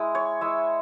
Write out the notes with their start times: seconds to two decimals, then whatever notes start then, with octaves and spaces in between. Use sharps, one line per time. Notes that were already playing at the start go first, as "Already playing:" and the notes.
Already playing: G#3 E4
0.15 C#5
0.41 G#3 E4 E5